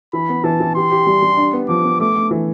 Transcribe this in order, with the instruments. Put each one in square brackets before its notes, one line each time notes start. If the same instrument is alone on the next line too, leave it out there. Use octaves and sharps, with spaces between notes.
[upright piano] E3 [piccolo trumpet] B5
[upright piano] B3
[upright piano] E3 [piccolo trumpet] A5
[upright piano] E3
[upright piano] G4 [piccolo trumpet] C6
[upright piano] G4
G3
G3
D4
B3
[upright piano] F3 [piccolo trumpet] D6
[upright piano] B3
[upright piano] A3 [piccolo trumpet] D6
[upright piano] A3
E3